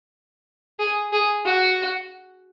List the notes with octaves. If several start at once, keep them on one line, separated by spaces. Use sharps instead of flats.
G#4
G#4
F#4